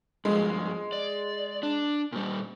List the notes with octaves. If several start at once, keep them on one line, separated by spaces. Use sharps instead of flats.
G2 F3 G#3
D5
D4
A#2 G3